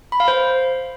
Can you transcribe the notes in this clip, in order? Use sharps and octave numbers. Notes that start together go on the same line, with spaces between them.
B5
F5
C5